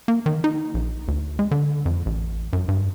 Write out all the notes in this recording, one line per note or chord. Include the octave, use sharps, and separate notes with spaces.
A#3
D#3
D#4
A#1
D2
G#3
D3
F2
A1
F#2
G2